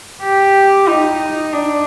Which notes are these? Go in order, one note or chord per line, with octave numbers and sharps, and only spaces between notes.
G4
D#4
D4